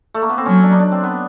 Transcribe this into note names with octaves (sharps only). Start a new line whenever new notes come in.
A3
A#3
B3
C4
F#3 C#4
D4
D#4
D4
C4
B3